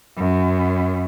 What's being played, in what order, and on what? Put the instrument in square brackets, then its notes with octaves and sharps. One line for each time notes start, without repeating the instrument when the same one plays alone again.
[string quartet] F#2